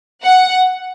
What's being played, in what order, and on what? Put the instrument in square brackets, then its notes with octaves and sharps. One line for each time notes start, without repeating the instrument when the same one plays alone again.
[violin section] F#5